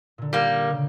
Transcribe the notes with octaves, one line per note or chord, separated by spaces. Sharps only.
A#2 D3
G3 A#3 F4
C#3